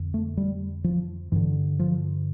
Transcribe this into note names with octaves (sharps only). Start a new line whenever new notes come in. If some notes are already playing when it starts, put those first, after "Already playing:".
Already playing: F2 D3
A3
G3
F3
G2 D3 E3
F3